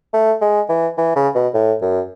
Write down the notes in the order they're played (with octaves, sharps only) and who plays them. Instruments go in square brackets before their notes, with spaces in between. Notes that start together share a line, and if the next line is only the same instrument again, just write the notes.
[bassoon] A3
G#3
E3
E3
C#3
B2
A2
F#2